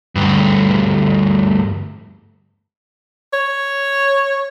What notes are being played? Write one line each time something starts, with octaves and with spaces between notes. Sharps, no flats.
D2 G2
C#5